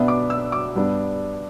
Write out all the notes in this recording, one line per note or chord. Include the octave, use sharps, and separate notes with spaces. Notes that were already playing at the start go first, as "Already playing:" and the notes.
Already playing: B2 B3 D4 E5
D6
E6
D6
G2 G3 B3 D4